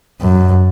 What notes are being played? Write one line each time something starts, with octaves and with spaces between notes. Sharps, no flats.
F#2